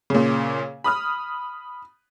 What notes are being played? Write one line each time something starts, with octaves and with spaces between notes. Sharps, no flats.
A#2 C#3
B5 D#6 F6